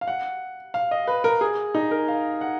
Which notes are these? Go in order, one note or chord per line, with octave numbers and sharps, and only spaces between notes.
F5
F#5
F5
D#5
B4
A#4
G#4
D#4
A#4
F5
F#5